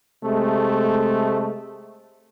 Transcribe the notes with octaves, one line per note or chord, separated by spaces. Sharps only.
C3 G#3 A3